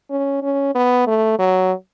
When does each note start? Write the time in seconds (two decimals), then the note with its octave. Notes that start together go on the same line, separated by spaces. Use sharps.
0.10 C#4
0.42 C#4
0.75 B3
1.07 A3
1.39 F#3